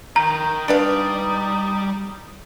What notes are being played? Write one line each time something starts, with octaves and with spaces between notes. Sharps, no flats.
D#3 D#5 G5 A#5
G3 D4 D#4 B4 D5 F5